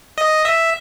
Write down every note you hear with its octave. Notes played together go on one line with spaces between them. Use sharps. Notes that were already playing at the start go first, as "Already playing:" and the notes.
D#5
E5